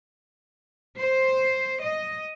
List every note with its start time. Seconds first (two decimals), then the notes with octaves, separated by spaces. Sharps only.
0.97 C5
1.82 D#5